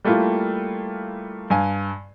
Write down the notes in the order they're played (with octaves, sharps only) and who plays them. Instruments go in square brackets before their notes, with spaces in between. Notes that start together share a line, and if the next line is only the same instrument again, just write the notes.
[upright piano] G3 A3 A#3 E4 F4
G2 F5 G#5